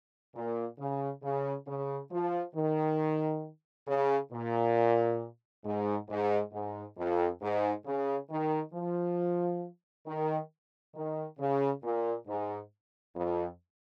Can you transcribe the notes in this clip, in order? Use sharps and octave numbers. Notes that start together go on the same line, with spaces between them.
A#2
C#3
C#3
C#3
F3
D#3
C#3
A#2
G#2
G#2
G#2
F2
G#2
C#3
D#3
F3
D#3
D#3
C#3
A#2
G#2
F2